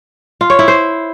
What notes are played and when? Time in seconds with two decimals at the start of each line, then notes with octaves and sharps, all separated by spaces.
0.41 F4
0.50 C#5
0.59 E4
0.68 C5